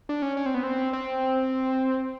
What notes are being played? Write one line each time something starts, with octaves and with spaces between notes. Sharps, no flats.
D4
C#4
C#4
C4
B3
C4
C4